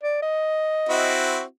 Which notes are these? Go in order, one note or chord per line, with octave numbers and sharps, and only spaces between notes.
D5
D#5
C4 E4 F#4